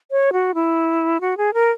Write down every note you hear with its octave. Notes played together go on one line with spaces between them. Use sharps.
C#5
F#4
E4
F#4
G#4
A#4